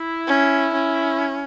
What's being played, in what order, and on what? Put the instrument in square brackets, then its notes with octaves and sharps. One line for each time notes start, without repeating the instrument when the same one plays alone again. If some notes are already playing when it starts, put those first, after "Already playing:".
Already playing: [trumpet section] E4
[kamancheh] C#4
C#4